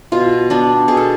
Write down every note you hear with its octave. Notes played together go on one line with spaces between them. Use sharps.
B2 F4
B3 D4
B2 G#4
A4